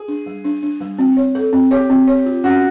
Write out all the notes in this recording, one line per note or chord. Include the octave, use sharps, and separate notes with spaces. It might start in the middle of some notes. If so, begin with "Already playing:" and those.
Already playing: G#4
D4
G3
D4
D4
G3
C4
C#5
A4
C4
G4 C#5
C4
C#5
F4
C#4 F#4